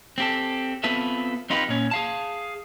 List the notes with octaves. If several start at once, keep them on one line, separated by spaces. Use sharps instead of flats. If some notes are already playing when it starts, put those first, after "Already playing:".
C4 G4 A4
B3 C4 F4 A4 B4 E5
C4 D#4 F4 G4 B4
A#2 C#4
G#4 F5 A5